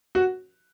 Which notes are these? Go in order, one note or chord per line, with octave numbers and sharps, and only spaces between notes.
F#4